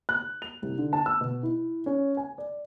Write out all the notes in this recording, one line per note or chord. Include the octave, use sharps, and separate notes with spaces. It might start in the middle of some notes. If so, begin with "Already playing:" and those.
F#6
F7
C2
D3
A5
E6
B2
E4
C#4
G#5
D5